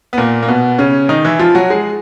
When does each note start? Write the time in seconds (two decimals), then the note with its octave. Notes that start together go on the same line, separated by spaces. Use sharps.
0.13 B3
0.18 A#2 A#3
0.42 A#3
0.48 B2 B3
0.78 C#3 C#4
1.09 D#3 D#4
1.24 E3 E4
1.39 F3 F4
1.55 F#3 F#4
1.70 G#3 G#4